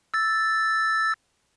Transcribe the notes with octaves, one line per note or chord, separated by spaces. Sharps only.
E6 A6